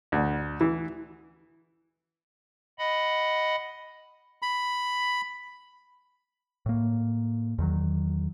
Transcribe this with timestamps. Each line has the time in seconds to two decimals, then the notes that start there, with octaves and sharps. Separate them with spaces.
0.12 D2
0.61 E3
2.79 D#5 F#5 B5
4.42 B5
6.66 A2 A#3
7.58 E2 D#3 F#3